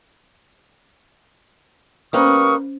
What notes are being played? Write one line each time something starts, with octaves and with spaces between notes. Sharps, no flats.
G3 A#3 C#4 B4 C5 C#6 D#6 F6